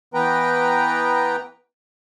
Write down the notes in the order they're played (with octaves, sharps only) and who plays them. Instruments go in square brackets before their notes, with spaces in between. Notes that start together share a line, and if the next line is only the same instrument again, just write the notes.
[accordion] E3 B3 B4 G5 A#5